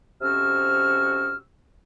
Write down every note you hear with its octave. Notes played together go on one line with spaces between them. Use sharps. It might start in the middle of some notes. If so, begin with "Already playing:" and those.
F2 C3 C#4 F#4 E6 F6